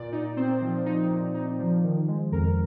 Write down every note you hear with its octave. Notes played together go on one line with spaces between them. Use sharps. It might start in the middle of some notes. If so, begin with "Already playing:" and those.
Already playing: A#2 D5
D#4
C4 C5
F3
D#4
A#2
D#4
F3
D#3
G#3
F2 A#4